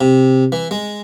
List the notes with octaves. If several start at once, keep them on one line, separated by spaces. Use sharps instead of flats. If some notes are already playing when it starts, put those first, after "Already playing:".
C3
E3
G#3